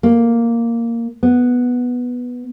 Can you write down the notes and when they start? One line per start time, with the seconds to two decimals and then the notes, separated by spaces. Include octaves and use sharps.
0.03 A#3
1.23 B3